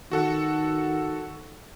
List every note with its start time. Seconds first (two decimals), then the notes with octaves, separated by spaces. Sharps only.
0.12 D#3 F#4 A4 F#5